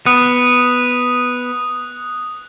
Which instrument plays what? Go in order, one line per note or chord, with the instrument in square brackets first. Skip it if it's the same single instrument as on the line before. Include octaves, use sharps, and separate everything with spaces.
[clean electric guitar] B3 [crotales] D#6 F#6